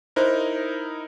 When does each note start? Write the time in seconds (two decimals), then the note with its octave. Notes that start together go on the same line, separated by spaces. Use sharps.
0.16 D#4 E4 A#4 C5 C6